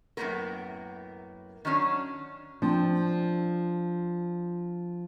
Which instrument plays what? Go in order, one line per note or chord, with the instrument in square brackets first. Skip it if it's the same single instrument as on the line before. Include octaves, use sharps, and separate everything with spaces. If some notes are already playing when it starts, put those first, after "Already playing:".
[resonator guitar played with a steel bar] F#2 A2 F3 A#3 B3 A#4
D#3 F#3 C#4 D4
[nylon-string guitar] F3 C4 D4